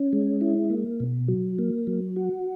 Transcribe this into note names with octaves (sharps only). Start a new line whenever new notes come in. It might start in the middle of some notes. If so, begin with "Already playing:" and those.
Already playing: C#4
G#3
E4
A#3
B2
F#3
A#3
F#3
F#4